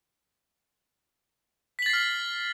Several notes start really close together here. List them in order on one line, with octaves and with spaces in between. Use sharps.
B6 F#7 A6 C7 F6